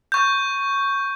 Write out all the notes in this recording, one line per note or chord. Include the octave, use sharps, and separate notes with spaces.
C#6 G6